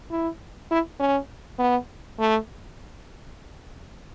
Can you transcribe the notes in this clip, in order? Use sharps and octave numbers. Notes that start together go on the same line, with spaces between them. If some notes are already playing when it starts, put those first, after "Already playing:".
E4
E4
C#4
B3
A3